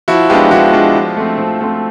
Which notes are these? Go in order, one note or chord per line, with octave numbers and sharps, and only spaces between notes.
F3 E4 F#4
G#3 B3 D4 F4 G4
F3 E4 F#4
G#3 B3 D4 F4
F3
A3 C4
F3
A3 C4